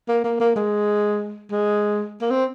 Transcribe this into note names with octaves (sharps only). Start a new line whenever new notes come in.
A#3
A#3
A#3
G#3
G#3
A#3
C4